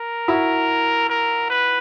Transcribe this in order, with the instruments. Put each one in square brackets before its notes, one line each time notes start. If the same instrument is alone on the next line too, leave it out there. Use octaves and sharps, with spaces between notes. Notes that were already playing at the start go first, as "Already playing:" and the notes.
Already playing: [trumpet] A#4
[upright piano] E4 F#4
[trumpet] A#4
B4